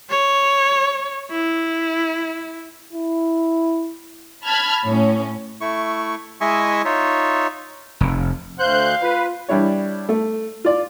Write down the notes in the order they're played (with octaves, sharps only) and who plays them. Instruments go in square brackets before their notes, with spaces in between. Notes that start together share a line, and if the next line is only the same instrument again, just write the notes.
[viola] C#5
E4
[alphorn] E4
[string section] A5 B5 F6 G#6
A2 C#4
[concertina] A3 E4 C#6
G#3 E4 D#5 E5 G#5 C#6
D#4 F4 C#5 E5
[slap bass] F1
[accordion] D2 F#6 G6 [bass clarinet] C5 [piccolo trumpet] F5
[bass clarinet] F4 [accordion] B4
[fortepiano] E3 G3 D4 E4 C#5
A3
F4 D5